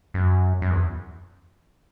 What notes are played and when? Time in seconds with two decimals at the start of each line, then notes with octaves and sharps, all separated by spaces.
0.14 F#2
0.62 F#2
0.71 E2